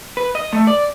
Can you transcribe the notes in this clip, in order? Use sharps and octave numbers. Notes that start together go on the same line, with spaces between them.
B4
D#5
A3
D5